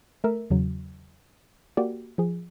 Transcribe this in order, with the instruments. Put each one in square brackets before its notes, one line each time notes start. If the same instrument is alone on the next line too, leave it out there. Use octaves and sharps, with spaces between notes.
[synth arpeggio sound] A3 A#4 E5
E2 C#3 F#3
A#3 F#4 G4 D5
F3 G#4